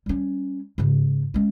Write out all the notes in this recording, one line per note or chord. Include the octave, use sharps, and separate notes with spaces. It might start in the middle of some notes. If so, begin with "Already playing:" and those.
G3 C#4
G#2 C#3
G#3 C#4